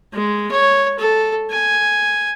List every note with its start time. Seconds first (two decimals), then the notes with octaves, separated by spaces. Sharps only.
0.13 G#3
0.51 C#5
0.99 A4
1.50 G#5